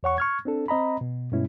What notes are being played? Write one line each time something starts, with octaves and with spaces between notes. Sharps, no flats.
E2 C#5 F#5 C#6
C#6 F6 G#6
C4 D4 A4
C4 D#5 A#5 B5
B2
G2 B2 G#3 C#4 E4